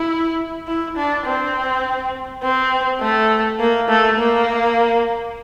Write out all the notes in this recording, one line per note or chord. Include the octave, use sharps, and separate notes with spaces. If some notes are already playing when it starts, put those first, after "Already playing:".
Already playing: E4
E4
D4
C4
C4
A3
A#3
A3
A#3